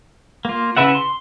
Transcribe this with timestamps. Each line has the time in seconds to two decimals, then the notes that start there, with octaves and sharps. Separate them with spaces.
0.45 A#3 F4
0.77 C#3 E4 B4 E5 F#5
0.95 C6